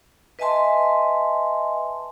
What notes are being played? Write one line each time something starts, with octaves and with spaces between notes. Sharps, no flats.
B4 D#5 E5 G#5 A5 C6